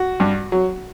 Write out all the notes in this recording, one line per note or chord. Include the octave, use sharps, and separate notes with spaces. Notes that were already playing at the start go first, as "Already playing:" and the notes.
Already playing: F#4
G2
F#3